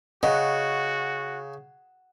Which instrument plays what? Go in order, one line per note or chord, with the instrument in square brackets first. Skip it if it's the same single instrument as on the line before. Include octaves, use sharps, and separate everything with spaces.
[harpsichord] C#3 [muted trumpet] F#4 [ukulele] D#5 [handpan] F#5